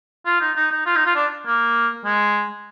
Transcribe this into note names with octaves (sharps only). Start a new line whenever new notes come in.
F4
D#4
D#4
D#4
F4
D#4
F4
D4
A#3
G#3